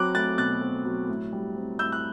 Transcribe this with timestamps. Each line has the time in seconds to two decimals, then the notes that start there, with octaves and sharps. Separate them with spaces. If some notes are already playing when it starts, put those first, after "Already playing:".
Already playing: F#3 C4 D6 F#6
0.15 A3 F#6 A6
0.38 B2 F#6 A6
0.61 C4
0.85 F#3
1.09 A2
1.33 G3
1.56 C4
1.79 A2 E6 G6
1.92 F#6